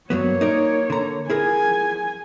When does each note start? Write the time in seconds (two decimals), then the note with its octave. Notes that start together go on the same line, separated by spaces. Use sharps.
0.10 G2 F#3 A#3 B3 C#5
0.41 D#4 A#4 D5
0.90 D3 A#5
1.30 E4 G#4 A#4 G#5